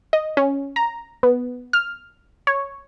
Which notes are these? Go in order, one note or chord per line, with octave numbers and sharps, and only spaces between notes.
D#5
C#4
A#5
B3
F6
C#5